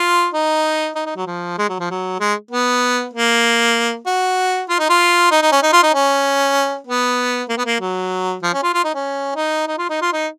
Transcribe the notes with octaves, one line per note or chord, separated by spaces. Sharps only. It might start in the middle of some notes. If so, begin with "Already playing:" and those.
Already playing: F4
D#4
D#4
D#4
F#3
F3
G#3
F#3
F3
F#3
G#3
B3
A#3
F#4
F4
D#4
F4
D#4
D#4
C#4
D#4
F4
D#4
C#4
B3
A#3
B3
A#3
F#3
F3
C#4
F4
F4
D#4
C#4
D#4
D#4
F4
D#4
F4
D#4